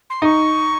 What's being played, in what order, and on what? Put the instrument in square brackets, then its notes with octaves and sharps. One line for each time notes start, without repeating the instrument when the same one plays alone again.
[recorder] C6
[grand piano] D#4 [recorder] C#6 D#6